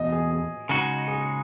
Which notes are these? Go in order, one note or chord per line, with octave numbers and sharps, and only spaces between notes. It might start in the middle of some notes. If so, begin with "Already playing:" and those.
Already playing: E2 B2 A3 D#5
G#4
G#4
C#3 G#3 D#4 F#4
G#4